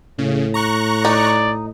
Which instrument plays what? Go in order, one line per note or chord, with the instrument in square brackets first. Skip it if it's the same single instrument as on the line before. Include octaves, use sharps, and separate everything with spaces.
[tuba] A2 [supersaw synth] C#3
[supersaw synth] A#5 C#6 F#6
[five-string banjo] D#4 [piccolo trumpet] D5